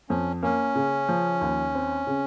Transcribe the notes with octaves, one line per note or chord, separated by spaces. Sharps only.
F2 C#4
A#3 C#4
C#3
F3
D#2
C4
C#3